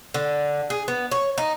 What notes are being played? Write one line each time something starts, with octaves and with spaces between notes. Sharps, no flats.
D3
G#4
B3
C#5
D#4